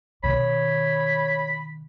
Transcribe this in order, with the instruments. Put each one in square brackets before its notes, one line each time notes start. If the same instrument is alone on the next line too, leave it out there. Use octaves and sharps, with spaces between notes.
[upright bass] B2 D#3 [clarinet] C#5 [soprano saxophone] B5